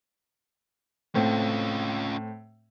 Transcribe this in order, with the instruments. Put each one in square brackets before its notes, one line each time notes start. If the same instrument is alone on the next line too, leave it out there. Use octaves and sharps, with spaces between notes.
[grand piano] A2 C4 [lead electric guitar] C#4 F4